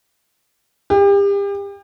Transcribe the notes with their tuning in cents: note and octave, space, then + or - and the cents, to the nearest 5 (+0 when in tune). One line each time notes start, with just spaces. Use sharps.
G4 +35